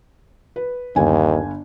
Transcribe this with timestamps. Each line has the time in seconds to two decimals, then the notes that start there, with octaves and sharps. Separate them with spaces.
0.56 B4
0.96 G1 D#2 G#5